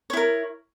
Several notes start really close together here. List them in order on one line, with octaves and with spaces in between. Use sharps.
C#5 E4 A#4